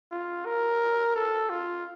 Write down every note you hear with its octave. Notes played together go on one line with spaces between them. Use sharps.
F4
A#4
A4
F4